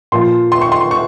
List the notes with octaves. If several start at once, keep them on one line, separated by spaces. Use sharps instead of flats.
A#2 F3 C6
C6
C#6
C6
C#6